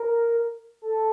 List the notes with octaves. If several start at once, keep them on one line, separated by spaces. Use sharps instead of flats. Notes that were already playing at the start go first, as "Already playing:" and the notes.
Already playing: A#4
A4